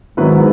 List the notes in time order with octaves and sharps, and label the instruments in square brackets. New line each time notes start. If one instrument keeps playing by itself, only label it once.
[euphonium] G#2 [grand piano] D#3 F#3 B3 E4 B4